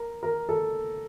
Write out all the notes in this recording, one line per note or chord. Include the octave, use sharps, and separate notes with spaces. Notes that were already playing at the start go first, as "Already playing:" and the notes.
Already playing: A#4
A#4
A4